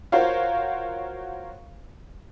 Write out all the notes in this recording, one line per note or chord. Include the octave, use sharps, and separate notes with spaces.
F4 F#4 A#4 C5 C#5 F5